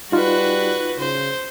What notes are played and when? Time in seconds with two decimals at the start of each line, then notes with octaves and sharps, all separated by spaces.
0.12 G3 D#4 F4 F#4 B4
0.99 C#3 C5